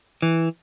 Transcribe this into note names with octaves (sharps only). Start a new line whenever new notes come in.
E3